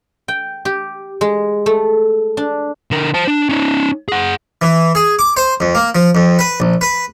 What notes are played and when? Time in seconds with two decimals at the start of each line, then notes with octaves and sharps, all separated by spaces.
0.28 G5
0.65 G4
1.21 G#3
1.66 A3
2.37 D4
2.91 D3 A#4
3.14 C5 A5
3.27 D4
3.49 C#4 D#4
4.08 G#4 F#5
4.62 E3
4.95 G#4
5.19 D6
5.37 C5
5.60 F2
5.75 A#3
5.95 F3
6.15 F2
6.39 B4
6.60 A#1
6.81 B4